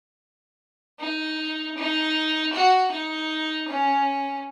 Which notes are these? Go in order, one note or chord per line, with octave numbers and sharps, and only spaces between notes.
D#4
D#4
F#4
D#4
C#4